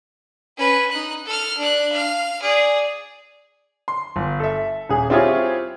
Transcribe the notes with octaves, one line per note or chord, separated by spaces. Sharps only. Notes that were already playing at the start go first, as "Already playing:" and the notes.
C#4 B4
D#4 F#6
A4 F6
D4 F#6
F5 F6
G#4 D5
C6
G1
A4 E5
D#1 G#4
C4 E4 F4 G4 G#4 C#5